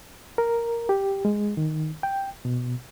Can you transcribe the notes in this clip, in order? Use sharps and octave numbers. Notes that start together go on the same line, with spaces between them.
A#4
G4
G#3
D#3
G5
B2